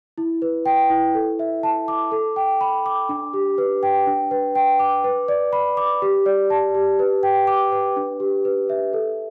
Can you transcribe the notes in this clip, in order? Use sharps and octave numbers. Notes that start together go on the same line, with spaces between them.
E4
B4
G5
E4
A4
E5
A5
D6
A4
G5
B5
D6
D4
G4
B4
G5
D4
B4
G5
D6
B4
D5
B5
D6
G4
D5
A5
G4
B4
G5
D6
B4
D4
G4
B4
E5
A4